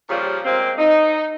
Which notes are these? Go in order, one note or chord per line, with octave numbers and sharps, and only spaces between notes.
A#2 C#3 F3 G3
A#2 G#3 A#3 C4
D#4